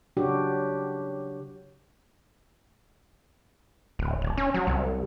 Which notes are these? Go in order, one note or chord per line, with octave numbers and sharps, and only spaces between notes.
C#3 F#3 D4 F#4 G4
D1
D1
C#4
F#3
C2